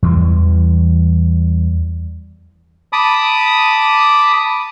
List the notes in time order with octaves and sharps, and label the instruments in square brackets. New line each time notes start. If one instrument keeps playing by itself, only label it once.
[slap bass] E2 E3 G3
[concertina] A5 B5 D6 D#6